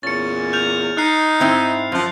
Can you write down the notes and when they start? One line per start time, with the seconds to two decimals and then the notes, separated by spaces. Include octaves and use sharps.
0.03 E2 A#2 C#4 A6 C#7
0.53 F6 G6 F7
0.97 D#4 F6 F#6 C7
1.40 G#2 C4 E4
1.92 F#2 F3 F4